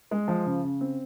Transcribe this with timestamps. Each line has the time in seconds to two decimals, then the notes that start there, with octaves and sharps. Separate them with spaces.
0.11 G#3
0.28 F3
0.46 C#3
0.63 C#3
0.81 C4